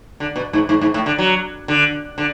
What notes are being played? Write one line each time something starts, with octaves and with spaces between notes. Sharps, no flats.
D3
B2
G#2
G#2
G#2
A2
D3
F#3
D3
D3